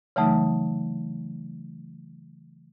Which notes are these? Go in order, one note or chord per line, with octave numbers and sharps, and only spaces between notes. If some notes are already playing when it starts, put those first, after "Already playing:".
C#3 E3 F#3 A3 D#4